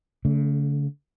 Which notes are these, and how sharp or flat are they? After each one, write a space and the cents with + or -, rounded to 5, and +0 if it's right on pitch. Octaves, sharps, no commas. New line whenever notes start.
D3 -45 A3 +0